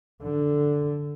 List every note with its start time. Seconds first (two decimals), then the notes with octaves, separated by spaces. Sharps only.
0.23 D3